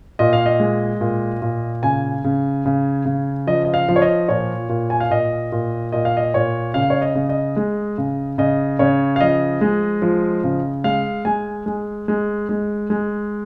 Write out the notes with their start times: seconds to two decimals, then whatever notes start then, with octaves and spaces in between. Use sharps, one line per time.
0.19 A#2 D#5
0.33 F5
0.46 D#5
0.60 G#3
1.01 A#2
1.42 A#2
1.83 C#3 G#5
2.24 C#3
2.66 C#3
3.05 C#3
3.47 F3 D#5
3.65 D#5
3.74 F5
3.89 F3
3.96 C#5
4.02 D#5
4.29 A#2 C#5
4.69 A#2
4.90 G#5
5.00 F5
5.10 A#2 D#5
5.52 A#2
5.92 A#2 D#5
6.05 F5
6.17 D#5
6.34 A#2 C#5
6.74 C#3 F5
6.90 C#5
7.02 D#5
7.15 C#3
7.29 D#5
7.56 G#3
7.98 C#3
8.38 C#3 D#5
8.79 C#3 C#5
9.16 F5
9.21 F3 D#5
9.61 G#3
10.02 F3
10.44 C#3
10.84 G#3 F5
11.25 G#3 G#5
11.66 G#3
12.08 G#3
12.49 G#3
12.90 G#3